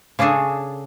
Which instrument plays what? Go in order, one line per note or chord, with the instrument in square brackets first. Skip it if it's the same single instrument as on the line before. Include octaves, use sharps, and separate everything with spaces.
[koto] C#3 C#4 D4 G#4 A4